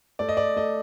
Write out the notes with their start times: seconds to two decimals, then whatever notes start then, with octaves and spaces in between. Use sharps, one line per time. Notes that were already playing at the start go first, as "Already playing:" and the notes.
0.19 A3 D5
0.29 D#5
0.37 D5
0.56 A3 D#5